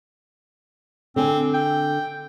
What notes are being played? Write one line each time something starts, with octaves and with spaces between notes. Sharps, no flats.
D3 C4 G#5
G5